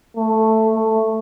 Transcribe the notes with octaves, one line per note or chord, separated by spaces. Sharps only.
A3
A3